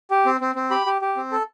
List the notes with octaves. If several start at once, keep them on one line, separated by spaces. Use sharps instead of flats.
G4
C4
C4
C4
G4 B5
G4
G4
C4
A4